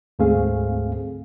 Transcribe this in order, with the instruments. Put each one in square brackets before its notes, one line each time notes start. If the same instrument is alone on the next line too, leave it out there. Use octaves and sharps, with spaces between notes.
[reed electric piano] D2 G#2 A3 C4 G#4 F5